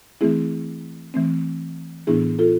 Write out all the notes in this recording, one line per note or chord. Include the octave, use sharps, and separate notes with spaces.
E3 A3 C4 E4 G#4
E3 A3 C4
A2 E3 B3 D4 E4 G#4
F4 A4